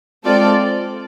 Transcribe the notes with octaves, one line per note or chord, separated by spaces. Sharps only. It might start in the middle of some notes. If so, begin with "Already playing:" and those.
G#3 C4 F4 A4 D5